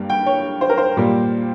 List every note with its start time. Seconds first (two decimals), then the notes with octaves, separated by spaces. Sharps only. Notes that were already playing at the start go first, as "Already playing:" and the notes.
Already playing: G2 G3 A#3
0.10 G5
0.26 C#5
0.61 C5
0.69 A#4
0.77 C5
0.97 A#2 G3 A#3